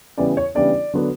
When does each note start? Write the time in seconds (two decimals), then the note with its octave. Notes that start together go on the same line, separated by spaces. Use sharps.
0.18 C#3 E3 G3 B3 D5
0.37 C#5
0.55 C#3 E3 G3 B3 D4 D5
0.93 D3 F#3 B3 D4